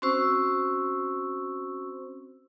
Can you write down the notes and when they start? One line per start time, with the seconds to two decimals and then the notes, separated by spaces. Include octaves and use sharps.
0.02 C4 C#4 F#4 C5 C#6 E6